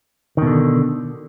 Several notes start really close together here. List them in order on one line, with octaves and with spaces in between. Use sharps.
D#3 B2 D3